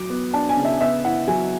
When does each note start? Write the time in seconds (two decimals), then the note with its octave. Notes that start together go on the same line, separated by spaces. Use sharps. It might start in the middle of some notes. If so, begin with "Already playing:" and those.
Already playing: F#3 D6
0.10 B3
0.33 D4 A5
0.49 G#5
0.57 C#3
0.65 E5
0.81 B3 E5
1.04 E4 F#5
1.28 F#3 G#5